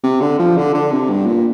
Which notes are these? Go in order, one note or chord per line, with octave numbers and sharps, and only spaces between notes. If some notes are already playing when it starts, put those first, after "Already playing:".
C3
D3
F3
D3
D3
C3
G2
A#2